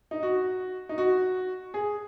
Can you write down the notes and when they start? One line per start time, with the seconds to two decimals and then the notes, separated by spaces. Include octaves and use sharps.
0.11 D#4
0.23 F#4
0.89 D#4
0.98 F#4
1.74 G#4